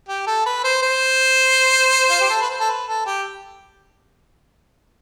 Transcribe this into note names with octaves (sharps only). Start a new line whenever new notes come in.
G4
A4
B4
C5
C5
F4
G4
A4
B4
C5
A4
B4
A4
G4